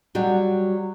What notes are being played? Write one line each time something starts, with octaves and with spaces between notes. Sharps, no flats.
F#3 G3